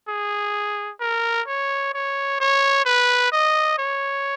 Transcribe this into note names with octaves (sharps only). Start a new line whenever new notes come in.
G#4
A#4
C#5
C#5
C#5
B4
D#5
C#5